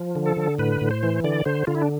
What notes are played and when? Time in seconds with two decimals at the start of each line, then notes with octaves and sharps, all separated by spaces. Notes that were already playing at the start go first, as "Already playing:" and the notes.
Already playing: F3
0.15 D3
0.26 A4
0.37 D3
0.59 A2 B4
0.81 A2
0.91 C5
1.03 E3
1.24 D3 D5
1.45 D3 C5
1.67 D3 F4
1.75 E4
1.82 D4